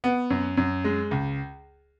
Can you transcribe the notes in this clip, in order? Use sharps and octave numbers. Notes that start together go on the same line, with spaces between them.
B3
F#2
F#2
G#3
C#2